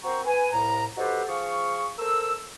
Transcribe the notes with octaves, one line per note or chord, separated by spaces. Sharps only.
C4 F#4 A#4 C5 A#5 C#6
B4 G#5
C2 A2 A#5
D#4 F#4 G4 A4 B4 C5
F3 G#4 F5 C#6
A4 A#4 C5 E6